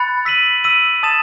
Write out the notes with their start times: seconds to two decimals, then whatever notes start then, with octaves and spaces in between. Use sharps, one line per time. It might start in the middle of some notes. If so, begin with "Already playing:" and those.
Already playing: B5 F#6 A6 C#7
0.25 E6 B6 D#7 F#7
0.64 E6 B6 D#7 F#7
1.03 A5 D#6 A6 E7